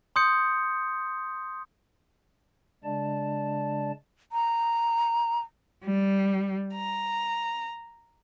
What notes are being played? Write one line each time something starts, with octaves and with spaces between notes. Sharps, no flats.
C6 D#6 G6 C#7
C#3 G#3 D4 D5 A5
A#5
G3
A#5